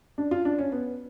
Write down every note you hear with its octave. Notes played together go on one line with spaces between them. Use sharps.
D4
F4
D4
C#4
B3